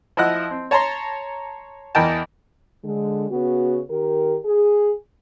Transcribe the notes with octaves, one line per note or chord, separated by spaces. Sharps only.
F3 E4 D#5 F#5 F#6
C4
C#5 A5 A#5 C6
E2 E3 A#4 D#5 G5 A5
D3 G#3
C#3 B3 F#4
D#3 G4 A#4
G#4